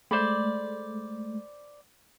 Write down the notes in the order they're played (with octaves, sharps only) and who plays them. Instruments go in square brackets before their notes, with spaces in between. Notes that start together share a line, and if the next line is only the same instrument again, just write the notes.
[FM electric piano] G#3 A3 [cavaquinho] C5 D5 B5